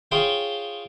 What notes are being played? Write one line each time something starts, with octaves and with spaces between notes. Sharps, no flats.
F4 G#4 C5 C#5 F5 G5